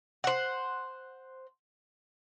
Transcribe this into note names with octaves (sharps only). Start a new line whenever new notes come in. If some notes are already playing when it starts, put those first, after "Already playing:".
C5 F#5